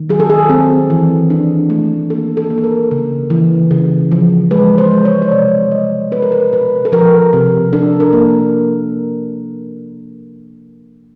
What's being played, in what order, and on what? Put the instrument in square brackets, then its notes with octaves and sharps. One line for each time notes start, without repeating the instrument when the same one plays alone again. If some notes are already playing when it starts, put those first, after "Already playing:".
Already playing: [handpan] D#3
F#3 G#4
A4
G#4
C4 G#4
E3
D4
A3
A#3 A4
A4
A#3
A4
A#4
C#3
E3
C#3
F3
G#3 B4
C5
G#3
C#5
C#5
C3 D5
G3 D#5
B3 B4
A#4
B4
B2 B4
A4
F3 A#4
C3
D4 A4
A#4
A#3